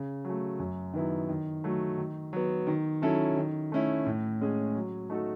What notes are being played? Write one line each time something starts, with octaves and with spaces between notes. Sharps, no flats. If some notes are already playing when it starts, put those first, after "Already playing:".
Already playing: C#3
F#3
A3
F#2
D#3 F#3 B3 E4
D#3
F#3 A3
D#3
F#3 B3
D#3
F#3 C#4 E4 A4
D#3
A3 C#4 E4
A2
G#3 C#4 G#4
F#3
A3 D#4 F#4 A4